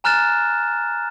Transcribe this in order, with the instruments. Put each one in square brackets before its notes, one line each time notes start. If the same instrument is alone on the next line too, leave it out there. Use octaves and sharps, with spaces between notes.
[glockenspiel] G#5 A#5 F6 F#6 A6 E7